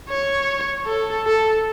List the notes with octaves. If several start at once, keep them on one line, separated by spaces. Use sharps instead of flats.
C#5
A4
A4